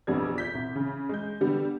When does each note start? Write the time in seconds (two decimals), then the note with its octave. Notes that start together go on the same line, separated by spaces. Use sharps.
0.07 A#1 F2 G3 B3 D4 G#6
0.38 G6 B6
0.54 C2
0.75 C#3
1.09 G#3 G6
1.41 D3 G3 B3